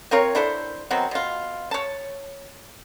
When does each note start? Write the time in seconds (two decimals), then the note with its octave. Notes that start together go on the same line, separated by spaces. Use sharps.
0.11 C4 F4 A#4 C#5
0.35 D4 E4 A4 C5
0.91 D#3 F#3 B3 C4
1.11 B2 F4
1.71 C#5 A5